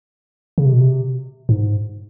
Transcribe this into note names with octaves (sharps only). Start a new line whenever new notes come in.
C#3
C3
B2
C3
G#2